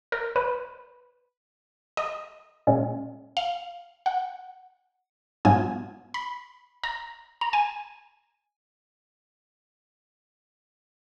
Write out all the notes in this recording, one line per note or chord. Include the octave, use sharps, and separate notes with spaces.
A#4
B4
D#5
A#2 G#3 C#4
F5
F#5
G#2 F#3 B3 F4 G#5
B5
A#5
A#5
G#5